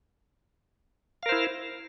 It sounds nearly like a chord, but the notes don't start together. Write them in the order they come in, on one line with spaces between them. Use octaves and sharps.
F5 A#4 C5 E4